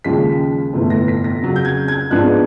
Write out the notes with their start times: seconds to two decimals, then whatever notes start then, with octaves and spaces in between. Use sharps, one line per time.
0.04 D#2 C#3 F3 G#3 C#4 B6
0.73 G1 F2 C3 E3 A3
0.90 A#6
1.08 B6
1.24 A#6
1.41 F2 C#3 F#3
1.56 G6
1.65 G#6
1.88 G#6
2.10 G#2 F3 G#3 B3 D4 F#6